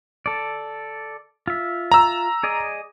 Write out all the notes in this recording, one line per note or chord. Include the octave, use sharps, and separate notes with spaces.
A4 D5
F4 E5
A#5 E6
G#4 D5 D#5